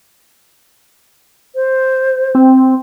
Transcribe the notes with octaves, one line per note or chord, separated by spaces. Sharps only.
C5
C4